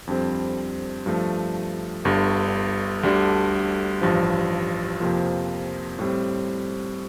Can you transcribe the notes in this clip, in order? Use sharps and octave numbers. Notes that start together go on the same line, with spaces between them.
F2 D3 G3 C4
G2 F3 A3
G1 G2 D3
D2 D3 G3 D4
A1 G2 F3
F2 C3 F3 A#3 F4
A2 G3 C4